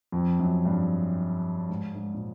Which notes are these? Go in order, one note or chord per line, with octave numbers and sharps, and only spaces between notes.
F2
F#2
G2
G#2
G#2
A#2